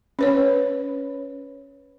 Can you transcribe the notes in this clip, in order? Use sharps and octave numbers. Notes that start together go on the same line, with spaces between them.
C#4 B4 C#5